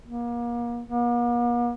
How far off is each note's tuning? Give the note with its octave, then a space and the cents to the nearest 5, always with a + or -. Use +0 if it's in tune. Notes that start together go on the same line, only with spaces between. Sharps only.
A#3 +35
A#3 +45